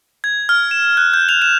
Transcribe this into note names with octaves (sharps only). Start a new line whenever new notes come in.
G#6
F6
E7
F#6
G6
F7
E7